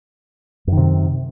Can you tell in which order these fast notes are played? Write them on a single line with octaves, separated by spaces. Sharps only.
F#2 D#3 C3